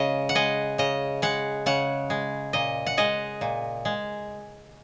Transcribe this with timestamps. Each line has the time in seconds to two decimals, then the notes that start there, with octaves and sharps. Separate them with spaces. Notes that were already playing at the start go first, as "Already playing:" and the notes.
Already playing: C#3 G#3 D#5
0.29 F#5
0.35 G#3 D#5
0.78 C#3 D#5
1.22 G#3 F#5
1.66 C#3 F#5
2.10 G#3
2.53 A#2 D#5
2.86 F#5
2.97 G#3 D#5
3.41 A#2
3.85 G#3